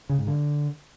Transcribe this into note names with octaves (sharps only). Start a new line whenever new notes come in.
C#3
G#2
D3